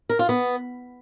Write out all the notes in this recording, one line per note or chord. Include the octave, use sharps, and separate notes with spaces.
A#4
F4
B3